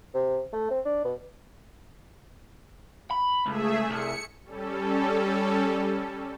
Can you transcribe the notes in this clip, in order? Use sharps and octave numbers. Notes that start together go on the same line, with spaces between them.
C3
A3
C4
D4
B2
B5
C#2 A3 G#4 E5
C2 C#7
G3 C#4 A4